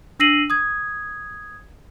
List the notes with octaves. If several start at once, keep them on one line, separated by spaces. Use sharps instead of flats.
D4 E6 A#6 C7 D#7 F#7
D#6 G#6